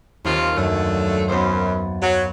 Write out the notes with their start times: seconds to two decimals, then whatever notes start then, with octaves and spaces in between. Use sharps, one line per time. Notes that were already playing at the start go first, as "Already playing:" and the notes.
0.25 D#2 C3 F4
0.56 F#2 D3 A3
1.28 F#2 B3 C5
2.01 F#3